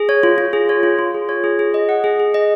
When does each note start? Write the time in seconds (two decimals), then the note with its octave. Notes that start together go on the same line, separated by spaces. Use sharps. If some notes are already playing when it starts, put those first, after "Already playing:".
Already playing: G#4
0.09 C#5
0.23 F4
0.38 F4
0.53 G#4
0.69 C#5
0.83 F4
0.98 F4
1.14 G#4
1.29 C#5
1.44 G#4
1.59 G#4
1.74 D#5
1.89 F#5
2.04 G#4
2.20 G#4
2.34 D#5